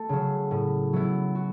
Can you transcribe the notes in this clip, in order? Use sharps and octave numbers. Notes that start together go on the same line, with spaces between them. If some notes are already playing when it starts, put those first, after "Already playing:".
Already playing: A3 A4
C#3 F#3
A2
F#3 B3 E4
F#4